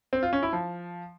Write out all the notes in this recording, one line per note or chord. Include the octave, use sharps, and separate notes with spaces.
C4
F4
C#4
E4
F3